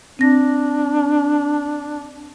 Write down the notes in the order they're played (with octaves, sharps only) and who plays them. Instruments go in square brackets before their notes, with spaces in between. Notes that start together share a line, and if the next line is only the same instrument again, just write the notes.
[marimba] C4 A#6 [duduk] D4